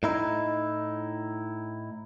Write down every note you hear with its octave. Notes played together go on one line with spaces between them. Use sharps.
A2 D#4 E4